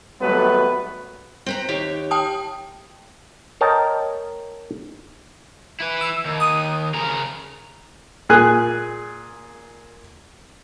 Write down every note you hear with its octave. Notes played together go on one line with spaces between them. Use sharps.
G#1 F#3 G3 A3 B3 B4
C4 B4 A#5
D#2 G4 C#5
G5 A5 D#6
A#4 C#5 D#5 G5 A5 A#5
E4 B4
E6
D#2
D#6
C#3 A#4
A#2 G#4 G#5 F#6